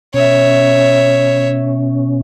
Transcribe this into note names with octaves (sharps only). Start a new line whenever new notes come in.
B2 C#4 C#5 E5